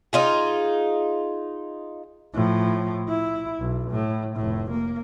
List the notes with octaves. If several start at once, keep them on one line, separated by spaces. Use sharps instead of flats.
D#4 F4 G#4
A2 F3
E4
B1
A2
F1 A2
A#3